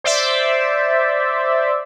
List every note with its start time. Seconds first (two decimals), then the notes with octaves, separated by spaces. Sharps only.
0.04 C5 D5 E5